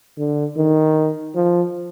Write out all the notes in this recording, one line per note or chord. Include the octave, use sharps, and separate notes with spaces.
D3
D#3
F3